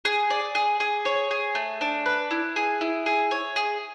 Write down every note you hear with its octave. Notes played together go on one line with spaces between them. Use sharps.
G#4
D5
G#4
G#4
C#5
G#4
A3
D4
B4
E4
G#4
E4
G#4
C#5
G#4